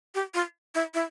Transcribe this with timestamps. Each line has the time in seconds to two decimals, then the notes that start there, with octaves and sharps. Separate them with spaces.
0.15 G4
0.34 F4
0.75 E4
0.94 E4